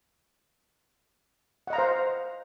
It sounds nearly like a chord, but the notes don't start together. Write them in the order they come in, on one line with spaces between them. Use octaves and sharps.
F#5 D#5 A#5 F5 C5